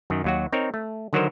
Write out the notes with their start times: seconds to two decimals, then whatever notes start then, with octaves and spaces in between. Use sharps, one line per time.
0.10 F#2 D#3
0.24 D#2 F#3 F#4
0.53 C4 D#4 A#4 C#5
0.74 A3
1.13 D3 D#3 F#3 F#4 A#4 C5